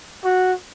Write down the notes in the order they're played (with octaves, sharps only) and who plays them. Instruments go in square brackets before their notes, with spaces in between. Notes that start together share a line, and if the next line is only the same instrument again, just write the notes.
[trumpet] F#4